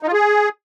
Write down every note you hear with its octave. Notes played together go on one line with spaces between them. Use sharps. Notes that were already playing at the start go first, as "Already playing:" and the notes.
D#4
F4
G#4